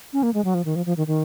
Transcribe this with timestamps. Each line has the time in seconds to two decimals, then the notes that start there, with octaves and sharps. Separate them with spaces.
0.13 C#4
0.23 A#3
0.34 G#3
0.44 F#3
0.54 F3
0.65 D#3
0.76 F3
0.86 F3
0.97 D#3
1.07 D#3